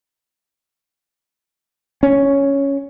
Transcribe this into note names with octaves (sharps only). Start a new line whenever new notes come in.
C#4